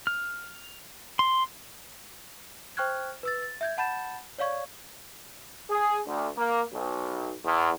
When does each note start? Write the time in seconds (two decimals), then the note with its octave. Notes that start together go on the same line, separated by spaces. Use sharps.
0.07 F6
1.19 C6
2.77 C5 G5 C#6 F6 F#6 G#6
3.23 B4 E6 A6
3.42 A6
3.61 E5 G6 G#6
3.78 F#5 A5 B5 G6 A6 E7
4.38 C#5 D5 F5 C#6 G#6
5.70 G#4
6.07 D2
6.37 A#3
6.73 B1
7.45 E2